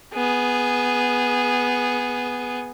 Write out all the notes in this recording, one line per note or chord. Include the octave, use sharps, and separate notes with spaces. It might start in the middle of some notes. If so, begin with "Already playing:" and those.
B3 G#4